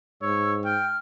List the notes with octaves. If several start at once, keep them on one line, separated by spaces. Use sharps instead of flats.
G#2 C#5 E6
G5 F6